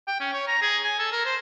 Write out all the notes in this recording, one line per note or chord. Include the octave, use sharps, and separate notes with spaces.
G5
C#4
C#5
A#5
G#4
G#5
A4
A#4
C5